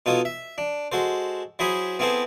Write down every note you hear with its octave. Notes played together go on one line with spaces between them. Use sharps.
B2 D#4 F4 A4 C#5 D#6
E5
D4
G#3 F#4 A4 C5
F#3 E4 G#4 C5 B5 D#6
B3 C4 E4 G#4 A4 C5